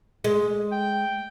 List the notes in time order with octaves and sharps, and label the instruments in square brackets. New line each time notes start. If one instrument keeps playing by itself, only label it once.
[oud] G#3
[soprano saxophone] G5